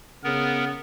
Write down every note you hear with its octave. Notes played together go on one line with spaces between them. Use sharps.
C#3 B3 A#4